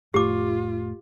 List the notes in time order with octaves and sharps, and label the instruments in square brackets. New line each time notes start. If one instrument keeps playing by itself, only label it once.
[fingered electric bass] F1 A2 [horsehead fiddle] F4 [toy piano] G4 D6